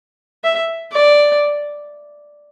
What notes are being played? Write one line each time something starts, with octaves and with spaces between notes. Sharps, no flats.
E5
D5